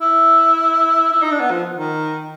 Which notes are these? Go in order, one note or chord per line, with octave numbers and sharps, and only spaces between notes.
E4
E4
D#4
D4
B3
F3
D#3